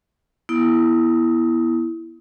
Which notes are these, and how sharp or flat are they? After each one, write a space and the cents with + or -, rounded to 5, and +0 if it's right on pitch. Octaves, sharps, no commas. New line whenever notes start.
B3 -25 E4 +0 D#6 +25